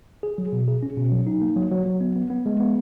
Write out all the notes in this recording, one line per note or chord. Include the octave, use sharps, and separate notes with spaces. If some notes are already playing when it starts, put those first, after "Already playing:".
G#4
F#3
B2
G#4
C#4
B2
F#3
D#4
A#3
F#3
F#3
F#3
B3
B3
B3
G#3
B3